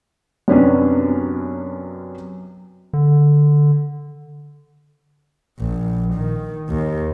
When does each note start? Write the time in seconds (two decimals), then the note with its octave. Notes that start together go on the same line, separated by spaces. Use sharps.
0.48 F#2 C3 B3 C#4 D4
2.93 D3
5.60 A#1
6.15 D#3
6.69 D#2